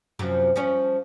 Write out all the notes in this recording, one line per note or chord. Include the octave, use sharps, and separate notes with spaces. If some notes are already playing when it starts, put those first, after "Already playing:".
F#2 C3 F3
F3 G3 C#4